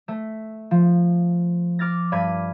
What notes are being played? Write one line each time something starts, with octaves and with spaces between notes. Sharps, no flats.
A3
F3
D6 F6 A6 A#6
G2 D5 B5 G#6 D#7